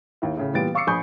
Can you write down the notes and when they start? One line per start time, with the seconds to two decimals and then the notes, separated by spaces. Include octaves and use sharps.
0.22 D#2 E4
0.37 A2 C#3
0.53 A#2 E3 G3 B3 A6 D7
0.75 F5 C#6 D6 E6 C7 C#7
0.87 A#1 G#5 B5 C#6 D#6 G6